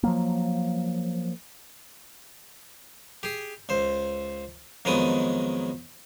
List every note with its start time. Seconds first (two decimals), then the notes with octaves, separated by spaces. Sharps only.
0.03 F3 F#3 A#3
3.23 G4 G#4
3.69 C#2 C5
4.85 F2 D#3 F#3 G#3 B3 D#6